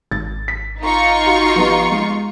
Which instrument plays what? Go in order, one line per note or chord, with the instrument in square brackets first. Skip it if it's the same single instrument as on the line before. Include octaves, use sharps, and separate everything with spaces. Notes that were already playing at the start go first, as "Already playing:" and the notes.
[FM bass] G#1 [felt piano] A6
[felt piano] B6
[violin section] D#4 F4 C#6
[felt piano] F#4
F3 G3 B3
G#3